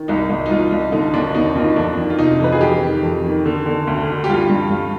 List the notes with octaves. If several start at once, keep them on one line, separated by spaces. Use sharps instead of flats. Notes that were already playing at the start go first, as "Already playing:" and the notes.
Already playing: D#3
C2 D#4
C2
D#4
C2 F4
C2
D3 D#4
D#2 D4
D#2 D#4
D#2 F4
F2 D4
D#3
F4
C3 D#4
F2 B4
G#4
F2 G4
D#3
F2
D#3
D3
D3
D2
D3
G4
G2 F4
G2
G2